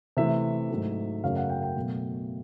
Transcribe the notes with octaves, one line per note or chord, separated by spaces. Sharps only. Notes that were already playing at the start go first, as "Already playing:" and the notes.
C3 E3 A3 E5
G#2 D#3 F#3 A3
F#2 C#3 F#3 A3 F5
F#5
G5
G5
B2 F#3 A3